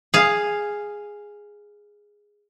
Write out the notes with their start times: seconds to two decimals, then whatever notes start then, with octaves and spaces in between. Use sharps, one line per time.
0.14 G#4 F5